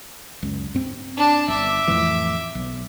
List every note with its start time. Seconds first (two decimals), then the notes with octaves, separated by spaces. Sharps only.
0.43 C#2 F#2
0.74 G2 C4
1.17 D4 A5
1.48 G1 E5 D6
1.88 F2 A2 E3
2.55 B1